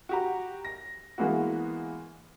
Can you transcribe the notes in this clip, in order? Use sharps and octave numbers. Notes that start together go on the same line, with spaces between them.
F#4 G4 A#5
A#6
E3 G#3 A#3 B3 F#4